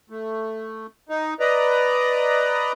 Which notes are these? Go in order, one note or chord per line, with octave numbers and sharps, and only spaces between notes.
A3
D#4
B4 D5 D#5 A#5